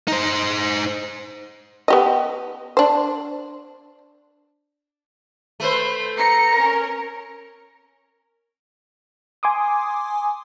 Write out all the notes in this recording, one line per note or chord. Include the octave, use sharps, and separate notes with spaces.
D#4 C5
B3 G4 D#5
D4 C5
A3 B4 C5
A#5 C#7
C#4 A#4
G#5 C6 D6 D#6